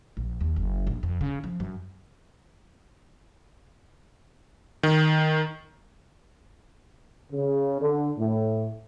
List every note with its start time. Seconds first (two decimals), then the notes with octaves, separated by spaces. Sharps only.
0.17 A#1
0.41 D#2
0.56 F#1
0.87 A#1
1.03 F2
1.21 C#3
1.44 F3
1.60 F#2
4.83 D#3
7.32 C#3
7.81 D3
8.18 A2